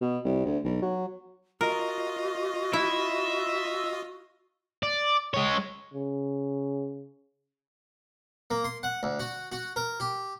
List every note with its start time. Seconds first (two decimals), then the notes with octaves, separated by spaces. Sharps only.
0.01 B2
0.25 C2
0.45 D2
0.65 B1
0.82 F#3
1.61 F4 F#4 A#4 D#5
2.73 E4 E5
4.83 D5
5.34 G#3 C#5
5.94 C#3
8.50 A#3
8.64 C6
8.83 F#5
9.03 D2
9.19 F#4
9.52 F#4
9.76 A#4
10.00 G4